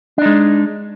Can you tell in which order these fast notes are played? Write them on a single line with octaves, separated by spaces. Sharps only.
D4 D#4 G#3